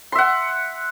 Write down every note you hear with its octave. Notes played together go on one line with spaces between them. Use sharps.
E5 F#5 C6